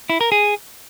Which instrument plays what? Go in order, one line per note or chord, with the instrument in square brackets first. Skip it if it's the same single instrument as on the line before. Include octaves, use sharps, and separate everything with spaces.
[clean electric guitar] E4
A#4
G#4